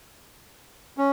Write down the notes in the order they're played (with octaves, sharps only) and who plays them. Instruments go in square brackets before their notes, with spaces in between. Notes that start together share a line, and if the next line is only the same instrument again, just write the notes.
[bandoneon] C#4